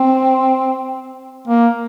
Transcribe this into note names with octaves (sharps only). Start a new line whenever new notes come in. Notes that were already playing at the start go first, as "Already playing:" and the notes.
Already playing: C4
A#3